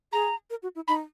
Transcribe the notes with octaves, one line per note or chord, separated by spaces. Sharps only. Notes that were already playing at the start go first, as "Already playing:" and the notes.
G#4 A#5
A#4
F#4
E4
D#4 B5